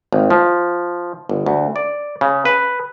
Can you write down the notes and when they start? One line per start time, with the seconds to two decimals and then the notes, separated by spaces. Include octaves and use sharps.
0.13 G#1
0.30 F3
1.29 G1
1.46 D2
1.76 D5
2.21 C#3
2.45 B4